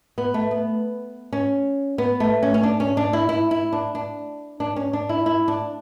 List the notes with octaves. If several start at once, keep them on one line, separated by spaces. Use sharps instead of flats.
B3
A3
B3
C#4
B3
A3
C#4
C#4
D4
C#4
D4
E4
E4
E4
D4
D4
D4
C#4
D4
E4
E4
D4